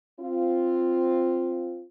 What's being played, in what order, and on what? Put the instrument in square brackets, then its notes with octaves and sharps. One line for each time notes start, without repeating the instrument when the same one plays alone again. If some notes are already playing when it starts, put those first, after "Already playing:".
[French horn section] C4 F4